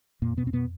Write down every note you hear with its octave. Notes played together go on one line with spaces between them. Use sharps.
F2 A#2 A#3
B2 B3
F2 C4
B2 B3